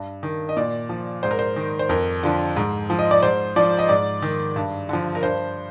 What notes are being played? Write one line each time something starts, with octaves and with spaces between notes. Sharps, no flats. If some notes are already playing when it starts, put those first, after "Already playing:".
Already playing: G2
D#3
D#5
A#2 D5
F3
G#2 C5
A#4
C5
D#3
C5
F2 A#4
D3 F3
G#2
F3
D#5
D5
G#2 C5
F3 D5
D#5
G#2 D5
D#3
G2
D3 F3
A#4
G2 C5